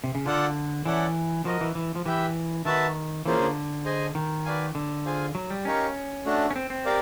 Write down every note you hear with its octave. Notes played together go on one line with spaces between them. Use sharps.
C3
C#3
D3 F4 A4 D5 F#5 A5
E3 C#4 E4 A4 D5 F#5
F3 F#4 A#4 D#5
E3
E3
F3
E3 G4 B4 E5 G5
D#3 F#4 B4 E5 A5
E3 A#3 C#4 F4 G#4 C5
D3
G#4 C5 D#5 G#5
D#3
F#4 B4 D5 F5 G#5
D3
F4 G#4 C5 F5 G#5
F#3
G3
C#4 D#4 G4 A#4 C#5 F5
A3 D4 F#4
C#4
C4
C4
G4 A#4 D5 F5